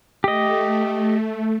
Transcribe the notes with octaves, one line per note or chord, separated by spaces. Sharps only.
A3 G4 D#5